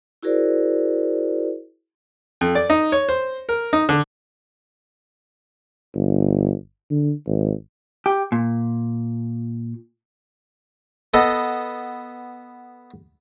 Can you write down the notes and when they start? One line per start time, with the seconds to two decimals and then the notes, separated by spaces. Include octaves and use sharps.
0.23 E4 F#4 G#4 A#4 C5 D5
2.41 F2
2.55 D5
2.70 D#4
2.92 C#5
3.09 C5
3.49 A#4
3.73 D#4
3.89 D3
5.95 G1
6.90 D3
7.27 G#1
8.06 G4
8.32 A#2
11.14 B3 A4 D#5